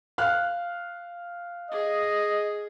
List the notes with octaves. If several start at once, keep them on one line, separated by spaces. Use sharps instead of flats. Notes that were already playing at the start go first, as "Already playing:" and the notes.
F5 F6 F#6
G#4 D#5